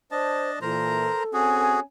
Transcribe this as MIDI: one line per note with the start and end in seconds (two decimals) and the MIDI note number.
0.11 0.59 62
0.11 0.50 72
0.11 0.59 75
0.11 0.59 81
0.61 1.09 46
0.61 1.09 52
0.61 1.78 69
0.61 1.23 70
0.61 1.23 72
0.61 1.23 82
1.34 1.81 60
1.34 1.81 61
1.34 1.80 66
1.34 1.80 68
1.34 1.81 80